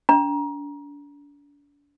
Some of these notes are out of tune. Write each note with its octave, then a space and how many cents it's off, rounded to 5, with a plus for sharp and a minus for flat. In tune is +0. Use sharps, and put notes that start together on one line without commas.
D4 -35 A#5 +25